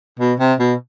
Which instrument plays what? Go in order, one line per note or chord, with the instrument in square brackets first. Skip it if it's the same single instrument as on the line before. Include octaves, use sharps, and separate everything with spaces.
[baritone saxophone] B2
C3
B2